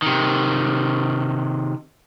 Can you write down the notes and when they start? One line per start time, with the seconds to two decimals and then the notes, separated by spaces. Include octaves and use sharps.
0.02 C3 D#3